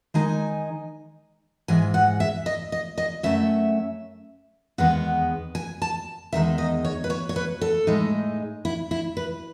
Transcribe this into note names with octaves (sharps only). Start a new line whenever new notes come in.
D#3 G#3 D#4 G#5
G#2 E3 G#3 G#5
F#5
E5
D#5
D#5
D#5
F#2 D#3 A3 C#4 E5
E2 D#3 G#3 B3 F#5
G#5
A5
E2 D#3 G#3 D#4 E5
D#5
C#5
B4
C#5
C#5
B4
A4
A2 G#3 D#4
E4
E4
B4